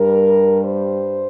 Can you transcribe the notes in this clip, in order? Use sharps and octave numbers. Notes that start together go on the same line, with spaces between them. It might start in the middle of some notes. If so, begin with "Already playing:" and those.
Already playing: G2 G3 A#4
C5